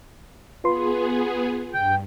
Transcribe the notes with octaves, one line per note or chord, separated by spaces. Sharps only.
B3 F4 G#4 B4 C6
G2 G5